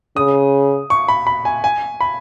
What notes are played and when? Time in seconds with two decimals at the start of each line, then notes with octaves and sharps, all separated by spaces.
0.16 C#3 D#6
0.90 C#6
1.08 B5
1.27 B5
1.45 G#5
1.64 G#5
2.01 B5